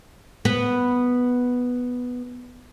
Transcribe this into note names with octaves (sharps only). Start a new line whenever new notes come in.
B3 B4